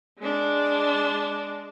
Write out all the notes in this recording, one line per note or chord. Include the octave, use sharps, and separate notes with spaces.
G#3 D4